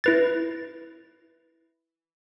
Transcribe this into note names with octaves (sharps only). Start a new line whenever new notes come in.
E4 B4 A6